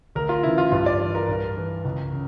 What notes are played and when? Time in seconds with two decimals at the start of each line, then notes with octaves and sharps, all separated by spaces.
0.15 D2 A#4
0.29 F4
0.43 C#3 E3 E4
0.58 F4
0.72 G2 F4
0.86 D5
1.00 E3
1.15 A#4
1.29 G2
1.57 E3
1.85 C#2
2.13 C#3